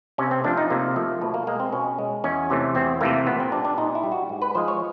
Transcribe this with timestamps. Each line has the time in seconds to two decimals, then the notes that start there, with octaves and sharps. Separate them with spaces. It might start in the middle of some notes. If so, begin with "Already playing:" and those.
0.18 C3 C#4
0.31 C4
0.44 F3 A3 D4
0.58 D#4
0.70 C3 A#3
0.96 F3 A3
1.21 B2 A3
1.34 A#3
1.47 G#3 A#3
1.60 C4
1.72 B2 C#4
1.99 G#3
2.24 E2 C#4
2.50 C3 E3 A3
2.75 E2 C4
3.01 C3 E3 A3 A#3
3.26 A#2 B3
3.40 C4
3.52 G3 D4
3.65 D4
3.78 A#2 D#4
3.95 E4
4.03 G3
4.12 F#4
4.29 G#2
4.42 B4
4.55 F3 G#3 C5
4.68 C#5